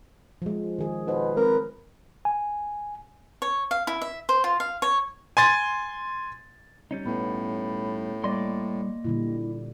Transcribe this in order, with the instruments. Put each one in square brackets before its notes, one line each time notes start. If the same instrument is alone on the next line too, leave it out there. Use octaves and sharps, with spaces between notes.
[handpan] F3 G#3
D#3 G#4
[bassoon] B2 [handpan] D#4 B4 C5
[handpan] G#3 C4 B4 [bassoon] A#4
[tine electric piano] G#5
[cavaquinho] C#5
F5
E4
E5
C5
F4
F5
C#5
[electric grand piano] G#5 C6 A6
[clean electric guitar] G3 C#4 D#4
[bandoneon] A2 [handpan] B3 [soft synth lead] B5
[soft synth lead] G3 [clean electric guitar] A#3 D#5 C6 [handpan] D5
[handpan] A#2 D3 G3 [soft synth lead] E4